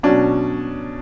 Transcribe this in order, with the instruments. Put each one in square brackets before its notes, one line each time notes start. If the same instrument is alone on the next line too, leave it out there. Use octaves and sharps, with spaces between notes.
[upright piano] B2 F#3 C#4 D4